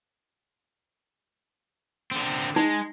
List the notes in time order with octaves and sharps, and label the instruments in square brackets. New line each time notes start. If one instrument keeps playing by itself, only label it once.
[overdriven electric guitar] D3 C4
[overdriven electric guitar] G#3 [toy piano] D#4